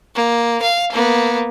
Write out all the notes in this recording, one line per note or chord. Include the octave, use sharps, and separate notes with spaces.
A#3
F5
A#3 B3